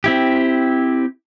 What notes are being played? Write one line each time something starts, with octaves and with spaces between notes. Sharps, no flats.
C4 E4 G4